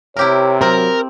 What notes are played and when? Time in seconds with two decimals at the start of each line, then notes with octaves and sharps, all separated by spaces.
0.17 C3 E4 G4 A#4 C#5
0.62 F#3 C4 A#4